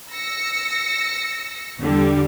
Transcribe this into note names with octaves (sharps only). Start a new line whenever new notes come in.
E6 A#6 C#7
E2 D3 G3